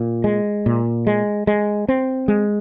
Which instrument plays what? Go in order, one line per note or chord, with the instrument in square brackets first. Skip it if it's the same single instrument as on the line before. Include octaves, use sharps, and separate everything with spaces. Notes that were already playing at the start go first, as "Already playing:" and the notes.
Already playing: [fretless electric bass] A#2
G#3
A#2
G#3
G#3
C4
G#3